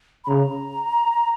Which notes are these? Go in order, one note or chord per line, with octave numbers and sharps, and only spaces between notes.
B5
C#3 A#5